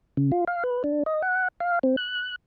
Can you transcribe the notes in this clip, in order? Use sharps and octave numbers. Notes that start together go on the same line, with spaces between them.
C#3
F4
F5
B4
D4
D#5
F#5
F5
C4
F#6